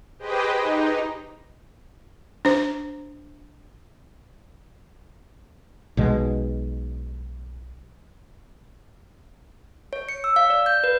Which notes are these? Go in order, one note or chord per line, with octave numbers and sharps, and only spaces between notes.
G4 G#4 B4 C5 D#5 G5
D#4
D4 C5
B1 B2 G#3
C#5
C#7
E6
F5
D5
G6
B4